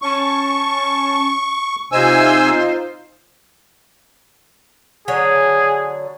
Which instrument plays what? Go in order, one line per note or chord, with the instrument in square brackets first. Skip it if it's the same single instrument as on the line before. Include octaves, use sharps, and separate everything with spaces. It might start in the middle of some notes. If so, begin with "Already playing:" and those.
[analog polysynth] C#4 A5 [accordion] C#6
[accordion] C3 G#5 E6 [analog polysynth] D#4 F4 [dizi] C5
[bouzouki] D3 F#3 C#5 [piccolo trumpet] G#4